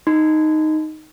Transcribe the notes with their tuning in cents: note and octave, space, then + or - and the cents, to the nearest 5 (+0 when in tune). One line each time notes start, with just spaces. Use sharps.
D#4 +0 C6 -40